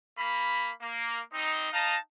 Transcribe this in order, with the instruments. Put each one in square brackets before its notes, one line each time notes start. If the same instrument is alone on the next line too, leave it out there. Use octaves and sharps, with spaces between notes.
[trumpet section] A#3 B5
A#3
G3 C4 D#4
D#4 D#5 F5 A5 A#5